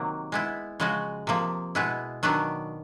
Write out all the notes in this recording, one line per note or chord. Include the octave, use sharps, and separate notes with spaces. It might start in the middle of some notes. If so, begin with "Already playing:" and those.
Already playing: C3 D#3 F#3 A#3
G#3 B3 E4
C#3 F3 G#3 C#4 F#4
C3 F3 A#3
B2 G#3 B3 E4
D#3 F#3 B3 D4